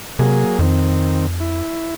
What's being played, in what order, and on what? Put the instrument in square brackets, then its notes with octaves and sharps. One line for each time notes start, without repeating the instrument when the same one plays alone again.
[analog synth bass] C3 [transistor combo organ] F#3 A#3 G#4
[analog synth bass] F2 [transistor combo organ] D#3 C4
[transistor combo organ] E4